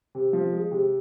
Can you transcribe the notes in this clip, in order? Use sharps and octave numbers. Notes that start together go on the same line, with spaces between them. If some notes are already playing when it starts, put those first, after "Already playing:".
C3
F3
G#3
C3